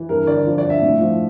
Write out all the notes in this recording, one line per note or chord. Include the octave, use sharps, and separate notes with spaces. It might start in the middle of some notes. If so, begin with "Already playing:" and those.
Already playing: E3
G2 A#4
D3 D5
F3
D5
G2
E5
A2
F3